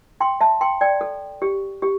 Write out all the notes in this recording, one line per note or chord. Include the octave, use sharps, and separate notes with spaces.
G5 C6
E5 A5
G5 C6
D5 G5
A4
G4
G4